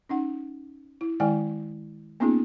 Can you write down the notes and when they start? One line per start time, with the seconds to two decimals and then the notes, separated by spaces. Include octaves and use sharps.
0.09 C#4 D#4 F#5
1.01 E4
1.20 D#3 G#3 E4 D5 G5 G#5
2.20 A#3 B3 C#4 D#4 F4 G#4